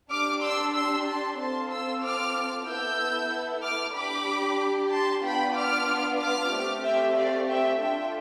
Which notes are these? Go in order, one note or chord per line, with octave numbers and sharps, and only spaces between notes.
D4 G4 D6 F6
C6 E6
C6 E6
A5 C6
C4 F4 A4 A5 C6
C6 E6
D6 F6
B3 E4 A4 E6 G6
D6 F6
D4 G4 B5 D6
A5 C6
B3 D4 F4 G5 B5
D6 F6
D6 F6
A3 C4 G4
E5 G5
D5 F5
E5 G5
D4 F4 A4 E5 G5